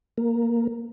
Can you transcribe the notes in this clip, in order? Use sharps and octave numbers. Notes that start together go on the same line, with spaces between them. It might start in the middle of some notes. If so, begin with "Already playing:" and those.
A#3